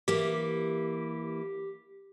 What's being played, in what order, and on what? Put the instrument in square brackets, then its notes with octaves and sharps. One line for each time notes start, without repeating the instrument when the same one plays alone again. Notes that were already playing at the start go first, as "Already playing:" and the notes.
[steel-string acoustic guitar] E3 A#3 [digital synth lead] G4